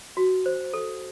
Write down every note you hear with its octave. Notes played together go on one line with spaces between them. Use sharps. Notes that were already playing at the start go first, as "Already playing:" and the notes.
F#4
C5
A4